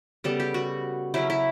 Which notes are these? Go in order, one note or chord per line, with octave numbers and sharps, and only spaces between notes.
C#3 G3 B3 A4
G4
F#4
C#3 F#3 C#4 E4
E4